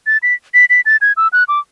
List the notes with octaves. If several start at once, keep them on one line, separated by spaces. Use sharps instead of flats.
A6
B6
B6
B6
A6
G#6
E6
F#6
D6